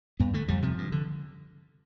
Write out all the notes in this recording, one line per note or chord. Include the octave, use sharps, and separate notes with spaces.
G2 B3
D3 A3
F2 G3
C3 F3
G2
D3